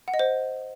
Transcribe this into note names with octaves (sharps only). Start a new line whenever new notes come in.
F#5
D#5
C5